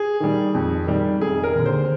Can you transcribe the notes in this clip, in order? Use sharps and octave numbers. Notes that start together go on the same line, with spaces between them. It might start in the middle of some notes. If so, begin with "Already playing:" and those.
Already playing: G#4
D#3 G3
F2
D#3 G3
F1 G#4
A#4
D#2 D3
C5